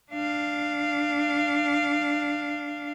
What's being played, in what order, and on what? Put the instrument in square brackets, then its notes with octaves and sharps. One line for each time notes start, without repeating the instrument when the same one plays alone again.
[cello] D4 F5